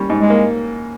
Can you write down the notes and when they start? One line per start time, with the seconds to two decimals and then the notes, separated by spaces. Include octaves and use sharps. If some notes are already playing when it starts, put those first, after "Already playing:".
Already playing: G3 A#3 C#4
0.10 G#2
0.20 G#3
0.30 A#3